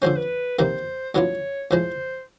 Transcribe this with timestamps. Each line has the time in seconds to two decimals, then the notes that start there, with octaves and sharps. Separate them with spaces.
0.02 D3 F3 G#3 C#4 C5
0.16 B4
0.59 C3 D#3 G3 A#3 C5
1.14 A2 F#3 B3 D4 F4 C#5
1.71 A2 F3 G#3 C5